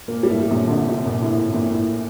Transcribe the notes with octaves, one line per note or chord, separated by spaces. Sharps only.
A#2 A#3
G3
A2 A3
A#1 A#2
D3
C2 C3
C2 C3
A#1 A#2
A2
A2
A2
A#1 A#2
A2